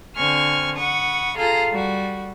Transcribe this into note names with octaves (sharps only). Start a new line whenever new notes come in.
D3 C4 G#5 C#6 F6
F#5 B5 C#6 D#6
F4 G#4 A4 F5 A#5
G3 F#4